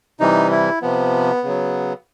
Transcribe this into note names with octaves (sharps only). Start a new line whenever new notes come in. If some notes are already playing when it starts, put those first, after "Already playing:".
C3 E3 G3 D#4
E4
C3 F3 B3
C#3 F#3